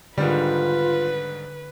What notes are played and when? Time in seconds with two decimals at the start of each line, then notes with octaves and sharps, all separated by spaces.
0.18 G#2 D3 D#3 G3 F4 B4